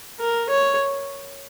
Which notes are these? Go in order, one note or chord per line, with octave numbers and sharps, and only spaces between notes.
A#4
C#5